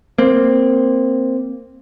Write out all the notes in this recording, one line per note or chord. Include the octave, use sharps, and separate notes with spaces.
A#3 C4